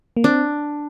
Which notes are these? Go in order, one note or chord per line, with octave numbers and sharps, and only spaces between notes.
A#3
C4 D4